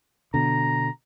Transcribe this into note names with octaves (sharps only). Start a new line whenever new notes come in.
B2 D3 A#5